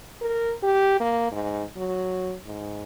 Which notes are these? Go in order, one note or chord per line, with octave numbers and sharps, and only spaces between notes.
A#4
G4
A#3
G#2
F#3
G#2